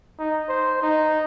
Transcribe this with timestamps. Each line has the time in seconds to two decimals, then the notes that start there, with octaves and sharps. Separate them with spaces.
0.19 D#4
0.49 C5
0.82 D#4